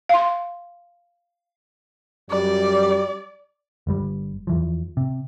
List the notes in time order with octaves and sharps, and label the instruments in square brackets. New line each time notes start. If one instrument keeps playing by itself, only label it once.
[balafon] F5 C6
[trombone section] F#2 G3 [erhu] D5
[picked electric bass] G1 G2 G3
E2 E3 F3
C3